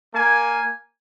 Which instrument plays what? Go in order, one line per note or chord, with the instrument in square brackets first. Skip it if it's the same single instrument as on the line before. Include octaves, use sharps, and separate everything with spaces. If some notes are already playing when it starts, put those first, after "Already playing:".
[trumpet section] A#3 G#5